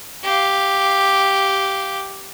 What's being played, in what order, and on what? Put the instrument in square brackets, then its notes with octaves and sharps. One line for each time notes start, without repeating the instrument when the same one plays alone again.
[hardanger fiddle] G4 F5